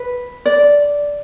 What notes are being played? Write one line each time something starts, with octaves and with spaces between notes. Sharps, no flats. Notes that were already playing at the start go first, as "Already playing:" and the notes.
Already playing: B4
D5